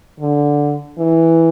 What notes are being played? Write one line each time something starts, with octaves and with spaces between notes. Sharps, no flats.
D3
E3